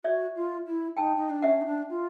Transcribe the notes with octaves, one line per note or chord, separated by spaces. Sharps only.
F#4 D5 E5
F4
E4
D#4 G5 A5
D#4
D4
C#4 E5 F#5
D#4
D4
F4